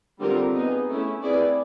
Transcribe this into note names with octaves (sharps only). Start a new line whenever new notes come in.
D3 G3 C4 F4 A#4
B3 D#4 G#4
A3 C#4 E4
C4 E4 G#4 B4 D5